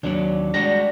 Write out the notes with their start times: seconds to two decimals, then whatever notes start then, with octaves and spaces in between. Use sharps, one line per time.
0.03 D#2 F#3 D4 C#5 D5
0.54 G3 G#3 D4 F#4 A#5 A#6